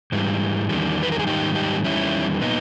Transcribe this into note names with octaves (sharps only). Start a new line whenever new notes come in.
G#2 E3 G3
E2 D#3 G3
B4
A#4
G#4
G#2 D#3 G3 D#4 G4
D#4 G4
E2 D#3 G3 C#4 E4
A#2 B3 D#4